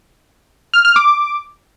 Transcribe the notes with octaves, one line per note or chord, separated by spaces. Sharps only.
F6
F6
D6